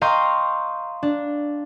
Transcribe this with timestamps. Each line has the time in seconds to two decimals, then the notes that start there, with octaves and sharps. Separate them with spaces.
0.01 D#5 F5 G5 A#5 C6 C#6
1.03 D4